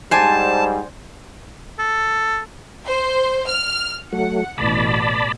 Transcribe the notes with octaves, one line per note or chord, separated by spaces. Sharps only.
G#2 G3 C5 D5 G#5 A5
A4
C5
F6
F#3 A3 F#5
A1 B2 D5 A5 B5